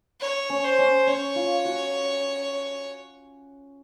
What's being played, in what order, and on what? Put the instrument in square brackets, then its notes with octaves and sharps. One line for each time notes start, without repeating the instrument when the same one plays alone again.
[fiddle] C#5
[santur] C#4
[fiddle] C5
[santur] C#4
[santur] C#4 [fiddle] C#5
[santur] F4
F#4